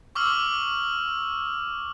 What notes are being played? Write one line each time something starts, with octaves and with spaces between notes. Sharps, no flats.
C#6 D6 E6 F6 F#7